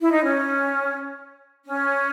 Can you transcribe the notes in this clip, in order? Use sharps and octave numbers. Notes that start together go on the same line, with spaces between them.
E4
D#4
C#4
C#4